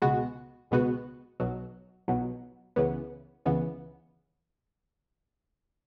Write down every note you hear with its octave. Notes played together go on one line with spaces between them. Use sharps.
C#2 B2 G#3 B3 F#4
C#2 B2 G#3 B3 F#4
B1 B2 F#3
B1 B2 F#3
C#2 C#3 E3 B3
C#2 C#3 E3 B3